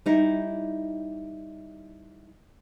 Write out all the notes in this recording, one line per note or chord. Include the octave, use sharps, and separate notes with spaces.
G3 D#4 E4